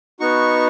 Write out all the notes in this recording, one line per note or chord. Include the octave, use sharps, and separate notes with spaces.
B3 D#4 F#4 C#6